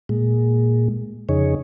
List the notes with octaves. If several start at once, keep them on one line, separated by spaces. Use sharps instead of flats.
A#2 G#3
F2 C#3 D#4 G#4 C#5